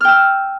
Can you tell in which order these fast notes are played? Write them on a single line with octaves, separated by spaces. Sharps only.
F6 G5 E6